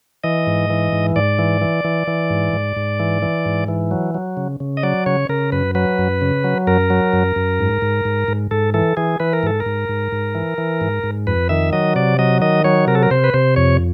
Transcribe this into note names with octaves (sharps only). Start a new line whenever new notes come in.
E3 D#5
G#2
E3
G#2
G#2 D5
E3
E3
E3
E3
G#2
G#2
G#2
E3
E3
G#2
E3
F#3
F#3
C#3
C#3
D#5
F#3 D5
C#3 C#5
C#3 A#4
F#2 B4
F#3 B4
F#2
C#3
F#3
F#2 A#4
F#3
F#2
F#2
G#2
G#2
G#2
G#2
G#2 A4
E3 A4
E3 G#4
E3 B4
A#4
G#2 A4
A#4
G#2
G#2
G#2
E3
E3
G#2
G#2
F2 B4
D#3 E5
F#3 D#5
C3 D5
F#3 D#5
D#3 D#5
F#3 C#5
C3 A#4
A4
A#4
C3 C5
B4
C3 C5
F2 C#5